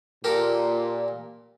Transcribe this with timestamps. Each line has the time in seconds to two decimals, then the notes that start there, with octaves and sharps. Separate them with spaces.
0.24 A#2 G4 A4 A#4